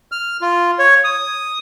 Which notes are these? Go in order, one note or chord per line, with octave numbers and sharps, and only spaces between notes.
F6
F4
C#5
D#6